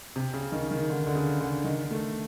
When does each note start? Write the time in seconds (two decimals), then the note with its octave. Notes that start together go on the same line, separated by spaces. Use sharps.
0.16 C3
0.34 C#3
0.52 D#3
0.71 D#3
0.90 D3
1.07 D3
1.15 C#3
1.41 D3
1.65 D#3
1.91 A3